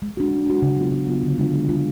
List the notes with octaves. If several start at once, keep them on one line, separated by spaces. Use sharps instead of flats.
G#3
D4 F#4
G#3
D4 F#4
C#3
F#3 B3 F4
C#3
F#3 B3 F4
D3
G#3 D4 F4
D3
G#3 D4 F4